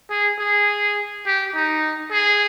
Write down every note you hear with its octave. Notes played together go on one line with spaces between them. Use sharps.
G#4
G#4
G4
D#4
G#4